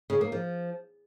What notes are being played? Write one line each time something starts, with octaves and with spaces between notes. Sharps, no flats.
C#3
A#3
F3